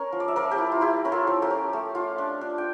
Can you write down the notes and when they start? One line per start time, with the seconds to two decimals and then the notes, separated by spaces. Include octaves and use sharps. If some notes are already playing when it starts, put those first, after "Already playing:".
Already playing: C#4 A#4
0.12 F3
0.20 D5
0.28 E5
0.36 F3 A#4 D5
0.51 G4
0.58 E4
0.72 F4
0.81 E4 G4
1.05 C#4 A#4
1.12 F4 A4
1.27 F3
1.42 G4 A#4
1.50 C#4
1.73 A3
1.95 F4
2.18 D4
2.41 D4
2.58 G5